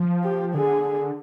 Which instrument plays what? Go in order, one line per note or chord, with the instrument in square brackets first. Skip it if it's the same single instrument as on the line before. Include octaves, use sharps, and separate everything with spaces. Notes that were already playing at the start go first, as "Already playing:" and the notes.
Already playing: [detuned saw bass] F3
[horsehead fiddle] G4
[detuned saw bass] D3 [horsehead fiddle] G#4